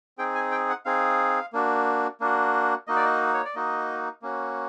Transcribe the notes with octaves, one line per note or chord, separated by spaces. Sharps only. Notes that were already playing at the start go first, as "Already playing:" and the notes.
C4 D#4 G#4 G5
G#5
G5
F#5
C4 D#4 G#4 F5
A#3 D4 F#4
A#3 D4 F#4
A#3 D#4 F#4 D#5
D5
D#5
C#5
D5
A#3 D#4 F#4 D#5
A#3 C#4 F#4